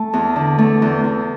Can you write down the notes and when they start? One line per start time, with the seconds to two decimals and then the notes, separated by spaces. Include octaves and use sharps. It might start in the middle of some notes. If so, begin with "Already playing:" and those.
Already playing: A3 A5
0.13 E2
0.36 D3
0.58 A3
0.82 E2
1.04 E2